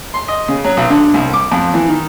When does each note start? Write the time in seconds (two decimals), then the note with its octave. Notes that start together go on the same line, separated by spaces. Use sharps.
0.14 C6
0.28 D#5
0.48 C#3
0.64 F#3
0.77 B1
0.90 D3
1.14 C2
1.34 D6
1.52 F2
1.74 E3
1.88 D#3